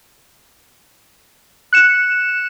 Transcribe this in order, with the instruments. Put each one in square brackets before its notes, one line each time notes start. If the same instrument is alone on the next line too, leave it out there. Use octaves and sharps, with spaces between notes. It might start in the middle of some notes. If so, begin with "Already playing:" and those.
[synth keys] F#6 C#7 E7